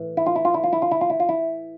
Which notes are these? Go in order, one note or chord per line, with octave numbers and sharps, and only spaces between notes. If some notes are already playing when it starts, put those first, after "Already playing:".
Already playing: A2 E3
E4
F4
E4
F4
E4
F4
E4
F4
E4
F4
E4
F4
E4